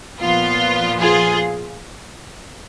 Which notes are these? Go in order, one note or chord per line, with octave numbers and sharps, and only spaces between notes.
A#2 F3 B3 F4
F4 G#4